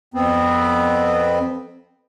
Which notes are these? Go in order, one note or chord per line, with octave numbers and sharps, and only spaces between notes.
F2 B3 C4